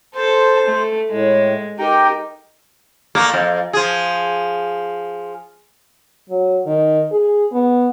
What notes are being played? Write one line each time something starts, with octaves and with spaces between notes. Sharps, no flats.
A4 C5 A5
A3
A2 G#3
D#4 G4 A#4 G5
A#2 A3 A#3
F2
F3 G#4
F#3
D#3
G#4
B3